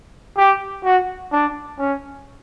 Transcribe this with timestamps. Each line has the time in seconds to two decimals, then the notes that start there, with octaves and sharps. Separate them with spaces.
0.37 G4
0.84 F#4
1.32 D4
1.79 C#4